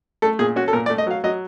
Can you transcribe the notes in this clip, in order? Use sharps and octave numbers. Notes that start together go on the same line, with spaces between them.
A3 A4
A#2 G#4
C#4 F#4
A4
A#2 A#4
D5
A3
D#5
F#3 F5
F#3 D#5